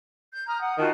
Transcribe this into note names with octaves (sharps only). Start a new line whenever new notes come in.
G6
A#5 D#6 F6
F#5 D#6
D#3 F4 F#4 A5